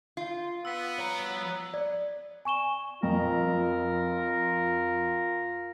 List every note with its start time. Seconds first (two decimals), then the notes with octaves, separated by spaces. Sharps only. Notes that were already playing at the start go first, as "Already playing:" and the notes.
0.17 F4
0.65 B3 E6 B6
0.99 C#5 A#5
1.74 D5
2.45 G#5 C#6 E7 G7
3.03 F2 F4 A#4